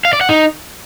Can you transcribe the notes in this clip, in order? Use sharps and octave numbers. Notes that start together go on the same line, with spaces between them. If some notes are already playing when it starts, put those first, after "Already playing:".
F5
D5
F#5
D#4